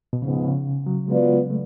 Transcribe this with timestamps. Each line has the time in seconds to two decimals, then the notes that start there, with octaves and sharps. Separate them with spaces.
0.13 B2
0.22 G#2 C#3 F3 B3
0.45 C#3
0.87 F#3
1.08 F#3 G#3 B3 F4 B4 D5
1.50 A3